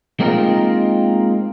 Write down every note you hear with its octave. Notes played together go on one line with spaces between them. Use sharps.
G#3 A#3 C4 D#4 F4 A#4